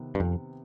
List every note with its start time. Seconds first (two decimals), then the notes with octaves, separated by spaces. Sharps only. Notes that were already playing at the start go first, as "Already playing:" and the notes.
Already playing: C3 D#3 B3
0.15 G2
0.20 F2